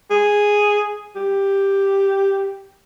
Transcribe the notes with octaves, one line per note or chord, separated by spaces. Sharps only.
G#4
G4